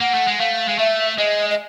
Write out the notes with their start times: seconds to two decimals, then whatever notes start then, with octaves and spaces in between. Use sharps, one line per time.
0.01 A#3 F#5
0.14 A3
0.27 G#3
0.39 A3 F5
0.68 G#3
0.78 A3 E5
1.18 G#3 D#5
1.51 D#5